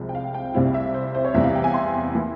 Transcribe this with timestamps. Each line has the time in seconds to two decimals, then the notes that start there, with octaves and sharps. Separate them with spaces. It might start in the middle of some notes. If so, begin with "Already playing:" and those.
Already playing: C2 C3 F3 G#3
0.09 G5
0.15 F5
0.34 G5
0.54 C2 C3 G3 C4 E4 F5
0.74 E5
0.94 C5
1.15 C5
1.24 C#5
1.34 E2 C3 E3 G3 E5
1.44 F5
1.55 G5
1.64 G#5
1.74 C6
2.15 E3 A#3 E4